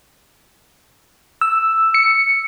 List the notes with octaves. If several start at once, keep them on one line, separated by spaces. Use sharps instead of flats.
E6
C#7